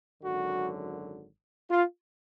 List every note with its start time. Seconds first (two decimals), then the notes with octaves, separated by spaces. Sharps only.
0.22 G#1 F#2 D3 F#3 F#4
1.71 F4